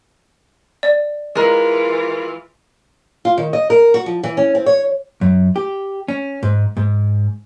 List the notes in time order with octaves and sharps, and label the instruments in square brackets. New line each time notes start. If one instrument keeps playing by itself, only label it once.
[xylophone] D5
[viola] E3 F4 [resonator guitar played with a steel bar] G#3 A#4
[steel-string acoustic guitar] F4
D#3
D#5
A#4
F#4
F3
E3
C#4
C4
C#5
[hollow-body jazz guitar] F#2
G4
C#4
G#2
G#2